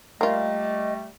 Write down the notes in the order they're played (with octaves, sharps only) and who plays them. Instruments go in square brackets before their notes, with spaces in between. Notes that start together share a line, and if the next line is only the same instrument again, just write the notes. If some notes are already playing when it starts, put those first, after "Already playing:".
[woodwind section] G3 A3 [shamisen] A#3 F4 [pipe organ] D#5